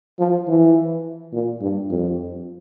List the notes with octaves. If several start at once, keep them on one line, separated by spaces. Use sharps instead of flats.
F3
E3
A#2
G2
F2